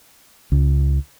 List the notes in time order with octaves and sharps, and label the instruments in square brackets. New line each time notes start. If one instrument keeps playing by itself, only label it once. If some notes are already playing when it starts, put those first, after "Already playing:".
[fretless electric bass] C#2